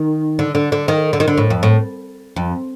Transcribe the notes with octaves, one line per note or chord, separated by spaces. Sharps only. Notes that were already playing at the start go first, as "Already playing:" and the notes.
Already playing: D#3
D3
D3
D3
D#3
D3
D#3
D3
A2
F2
A2
F2